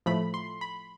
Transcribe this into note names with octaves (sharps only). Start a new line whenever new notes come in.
A2 F3 A3 B5
C6
B5